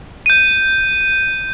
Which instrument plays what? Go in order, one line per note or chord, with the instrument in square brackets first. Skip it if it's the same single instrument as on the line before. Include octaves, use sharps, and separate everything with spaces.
[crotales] G6 D#7